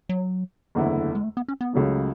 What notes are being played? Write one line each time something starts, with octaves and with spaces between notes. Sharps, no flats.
F#3
F#1 E2 D3 A3 E4
G#3
A3
B3
C#4
B3
C#2 C#3 F#3 A3